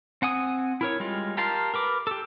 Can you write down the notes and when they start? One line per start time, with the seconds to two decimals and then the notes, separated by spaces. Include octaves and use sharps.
0.22 C4 F#5 G#5 D#6
0.81 E4 A#4 C#5
1.00 G3 G#3 F4
1.37 G4 A#4 F5 A5 C6
1.74 A#4 B4 D6
2.07 G4 A4